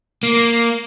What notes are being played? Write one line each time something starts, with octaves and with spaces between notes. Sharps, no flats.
A#3